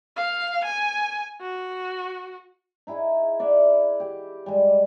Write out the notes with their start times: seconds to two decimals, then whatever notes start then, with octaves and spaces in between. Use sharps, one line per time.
0.17 F5
0.65 G#5
1.41 F#4
2.87 D#4 E4 G#4
3.40 D5 E5 F#5
4.00 G4
4.46 G3 G#3